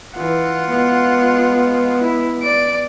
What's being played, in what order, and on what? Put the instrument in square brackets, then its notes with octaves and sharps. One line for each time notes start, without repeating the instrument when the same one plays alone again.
[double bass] E3 [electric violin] F4 F#5
[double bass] G#3 B3
[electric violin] E4
D5 D7